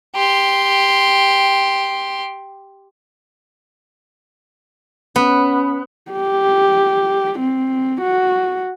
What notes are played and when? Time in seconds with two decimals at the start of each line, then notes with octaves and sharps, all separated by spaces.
0.15 G4 C6
5.16 B3 C#4
6.11 G4
7.39 C4
8.01 F#4